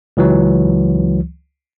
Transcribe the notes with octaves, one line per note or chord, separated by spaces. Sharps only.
C#2 E3 F#3